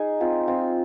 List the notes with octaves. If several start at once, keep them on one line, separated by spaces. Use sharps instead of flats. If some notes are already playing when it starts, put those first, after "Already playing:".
Already playing: D#4 G#4
C4 F4
C4 F4